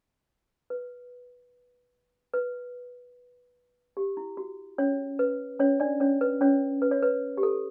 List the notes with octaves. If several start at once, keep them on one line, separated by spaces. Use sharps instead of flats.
B4
B4
G4
E4
F#4
C#4 C#5
B4
C#4 C#5
D4 D5
C#4 C#5
B4
C#4 C#5
B4
C#5
B4
G4
A4